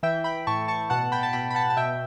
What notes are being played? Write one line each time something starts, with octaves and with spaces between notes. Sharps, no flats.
E3 E5 G5
G5 B5
A2 A5 C#6
A5 C#6
B2 F#5 A5
G5 B5
A5
B2 G5 B5
B5
F#5 A5
A5
B2 E5 G5